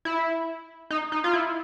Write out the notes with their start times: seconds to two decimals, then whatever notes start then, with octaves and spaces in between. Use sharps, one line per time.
0.05 E4
0.91 D#4
1.12 D#4
1.24 F4
1.33 E4